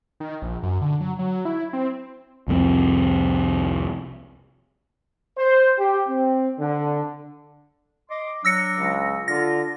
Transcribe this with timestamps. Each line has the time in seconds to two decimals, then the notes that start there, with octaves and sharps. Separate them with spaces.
0.20 D#3
0.42 A#1
0.63 F#2
0.81 D3
1.00 F#3
1.19 F#3
1.45 E4
1.73 C4
2.48 C2 F2 G#3 C4
5.37 C5
5.78 G4
6.08 C4
6.60 D3
8.10 D#5 C6 D6
8.45 F#3 D4 E6 A#6 C#7
8.77 C#2
9.28 D3 F4 A#6